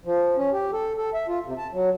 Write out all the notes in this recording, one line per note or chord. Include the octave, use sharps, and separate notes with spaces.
F3
C#4
G4
A4
A4
E5
F4
C3
A5
F#3